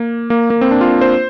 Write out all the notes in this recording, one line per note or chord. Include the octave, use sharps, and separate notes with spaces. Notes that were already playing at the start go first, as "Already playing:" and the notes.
Already playing: A#3
A#3
A#3
C4
D4
F4
C5